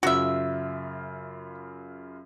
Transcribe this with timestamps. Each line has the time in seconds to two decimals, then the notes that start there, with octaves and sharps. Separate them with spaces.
0.03 F#2 C#3 F4 F#4 E5